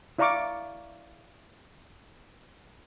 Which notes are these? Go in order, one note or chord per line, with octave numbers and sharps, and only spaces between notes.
E4 D5 F5 A#5 C#6 D6